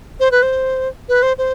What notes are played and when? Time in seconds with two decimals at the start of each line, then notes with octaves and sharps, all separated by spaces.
0.20 C5
0.31 B4
0.43 C5
1.09 B4
1.23 C5
1.38 C5